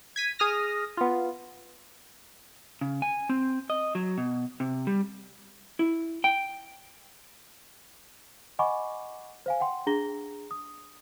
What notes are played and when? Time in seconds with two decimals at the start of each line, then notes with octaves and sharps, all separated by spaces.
0.16 G#6 B6 D#7
0.39 G#4 D#6 F6 A#6
0.97 B3 F4
2.81 C#3
3.02 G#5
3.29 C4
3.70 D#5
3.95 F#3
4.18 B2
4.60 C3
4.87 G3
5.79 E4
6.24 G5
8.59 D#5 F#5 G#5 B5 C#6 D6
9.46 C5 F5 G#5
9.60 F#5 G5 C6
9.87 D4 G#4 A#5 A#6 G7
10.51 D#6